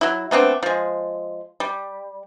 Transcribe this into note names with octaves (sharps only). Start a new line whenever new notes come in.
F#3 E4
A3 B3 C4 D4
F3 G#3
G3